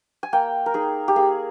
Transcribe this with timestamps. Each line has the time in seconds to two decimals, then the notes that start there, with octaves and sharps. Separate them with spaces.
0.23 G#5
0.33 A#3 G5
0.66 A#4
0.74 D#4 G#4
1.08 G4
1.16 A#3 G#4